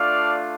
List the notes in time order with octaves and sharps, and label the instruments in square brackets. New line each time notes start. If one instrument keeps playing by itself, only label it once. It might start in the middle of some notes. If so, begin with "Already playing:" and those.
Already playing: [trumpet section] A3 D4 F4 D5 F5